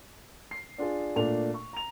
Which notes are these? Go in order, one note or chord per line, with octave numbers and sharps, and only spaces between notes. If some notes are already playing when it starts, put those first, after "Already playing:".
C7
D4 F4 G#4
A#2 A3 D4 F7
C#6
A#5 F7